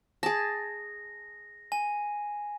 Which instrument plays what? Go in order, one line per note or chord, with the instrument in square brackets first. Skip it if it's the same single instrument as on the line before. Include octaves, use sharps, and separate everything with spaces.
[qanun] G#4 A5 [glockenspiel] A#6
[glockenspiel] G#5